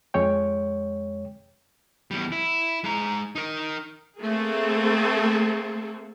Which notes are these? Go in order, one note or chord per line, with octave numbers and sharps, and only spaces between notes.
F2 G#3 C#5 G5
E2 G3
E4
G#3 A#5
D#4 A#4
A3 A#3 C4 G#4 A4